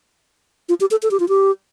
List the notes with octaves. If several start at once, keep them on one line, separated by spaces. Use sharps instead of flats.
F4
G4
A4
A4
G4
F4
G4